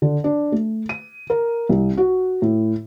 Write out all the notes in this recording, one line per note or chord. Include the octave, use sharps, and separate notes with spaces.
D3
D4
A3
D#7
A#4
C2
F#4
A2